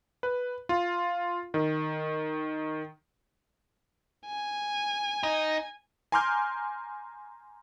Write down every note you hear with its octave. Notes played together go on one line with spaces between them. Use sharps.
B4
F4
D#3
G#5
D#4
G#5 A#5 C6 D6 F6 G6